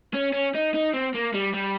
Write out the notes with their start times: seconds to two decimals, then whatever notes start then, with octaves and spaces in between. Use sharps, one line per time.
0.14 C#4
0.33 C#4
0.55 D#4
0.74 D#4
0.94 C4
1.15 A#3
1.34 G3
1.54 G3